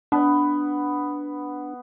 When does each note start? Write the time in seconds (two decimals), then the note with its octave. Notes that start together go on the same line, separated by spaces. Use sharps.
0.12 B3 D4